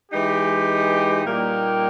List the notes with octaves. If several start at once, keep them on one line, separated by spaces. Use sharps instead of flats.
E3 G#3 D#4 G4
A#2 G3 A#3 D#4 G4